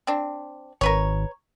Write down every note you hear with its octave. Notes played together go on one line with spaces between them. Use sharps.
C4 D4
G#1 A#4 B4 C#5